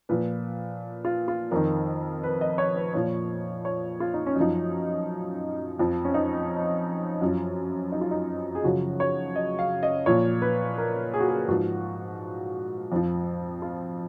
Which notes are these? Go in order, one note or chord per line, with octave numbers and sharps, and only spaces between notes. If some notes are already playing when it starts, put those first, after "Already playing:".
A#2 F3 B4
F4
F4
F2 D#3 A#4
B4
D#5
C#5
B4
A#2 F3 C#5
C#5
F4
D#4
C#4
F#2 F3 D#4
F2 F3
C#4
D#4
F#2 F3
D#4
F4
D#4
G#4
F#2 C#3 F3 F#4
C#5
D#5
F5
D#5
A#2 F3 C#5
B4
A#4
G#4
F#4
G#4
G#2 F3 F#4
F2 F3
F4